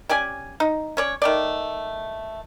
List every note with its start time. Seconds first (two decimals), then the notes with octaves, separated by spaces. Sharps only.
0.09 C#4 G4 D5 G#5
0.60 D#4
0.97 C#4 C#5 D5
1.22 D#3 A3 D5